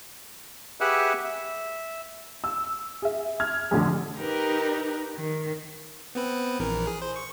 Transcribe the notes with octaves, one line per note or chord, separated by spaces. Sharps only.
G4 G#4 B4 E5 F#5
E5
E6
G#4 E5
F6 G#6
A1 F2 D3
D#4 G4 A#4 B4
D#3
B3 C4 B4
A#1 E3 A#4
G#4
C5
C#6